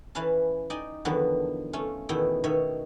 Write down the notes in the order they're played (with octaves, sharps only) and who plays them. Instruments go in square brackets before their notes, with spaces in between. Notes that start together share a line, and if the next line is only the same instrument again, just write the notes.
[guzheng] E3 C#4 B4 F5 A5
D#4 D5 D#5 G5 G#5
E2 D3 D#3 F3 F#3 B3
A3 C#4 F4
E2 B2 D#3 A3 E4 G5
B2 D#3 C#5 E5